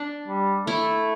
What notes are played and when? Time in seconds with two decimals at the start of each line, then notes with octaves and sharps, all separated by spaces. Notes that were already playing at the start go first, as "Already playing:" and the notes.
Already playing: D4
0.28 G3
0.67 A3 E4